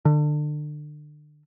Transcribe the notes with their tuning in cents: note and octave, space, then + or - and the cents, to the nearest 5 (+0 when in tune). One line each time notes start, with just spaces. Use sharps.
D3 +30